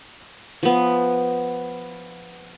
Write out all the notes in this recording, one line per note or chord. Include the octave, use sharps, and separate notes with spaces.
F3 B3